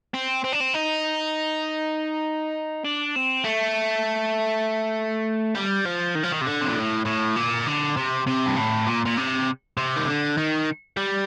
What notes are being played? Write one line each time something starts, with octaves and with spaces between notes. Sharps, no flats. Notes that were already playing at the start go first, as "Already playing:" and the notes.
C4
C4
D4
C4
D#4
D4
C4
A3
G3
F3
D#3
F3
D#3
C3
D3
C3
A#2
A2
A2
A#2
D3
C3
C3
G2
A2
A#2
A#2
C3
C3
D#3
D3
D#3
G3